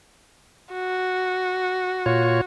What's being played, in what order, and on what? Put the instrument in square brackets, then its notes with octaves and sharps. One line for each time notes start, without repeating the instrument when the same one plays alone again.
[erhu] F#4
[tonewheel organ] A#2 F4 C#5